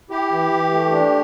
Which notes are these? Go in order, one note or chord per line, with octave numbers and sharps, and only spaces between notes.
E4 G4
E3
E3
A3
D4